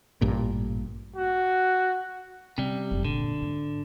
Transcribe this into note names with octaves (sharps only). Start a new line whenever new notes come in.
A1 G2 A#2
F#4
C3 G3 C#4
F#1 F2
A#2 D3
G#2